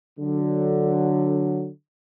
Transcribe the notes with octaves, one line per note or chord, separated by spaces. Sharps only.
D3 F#3